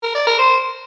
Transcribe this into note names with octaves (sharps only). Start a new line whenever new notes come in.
A#4
D5
A#4
C5